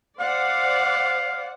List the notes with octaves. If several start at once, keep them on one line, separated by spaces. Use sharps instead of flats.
C5 D5 F5 F#5